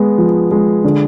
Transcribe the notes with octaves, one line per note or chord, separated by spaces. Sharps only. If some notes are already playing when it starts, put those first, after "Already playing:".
Already playing: G#3 B3
F3
G#3
D3